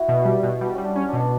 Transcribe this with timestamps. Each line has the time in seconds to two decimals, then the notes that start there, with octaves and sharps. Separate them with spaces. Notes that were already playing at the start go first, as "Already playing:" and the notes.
Already playing: E4 F#4
0.08 B2
0.25 G3
0.43 B2
0.61 G3 F#4
0.75 G3 C#4
0.84 D4
0.96 C#4
1.09 B2 D4
1.20 D4